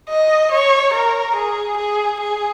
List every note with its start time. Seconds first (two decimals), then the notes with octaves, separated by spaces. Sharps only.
0.09 D#5
0.52 C#5
0.94 A#4
1.35 G#4
1.77 G#4
2.20 G#4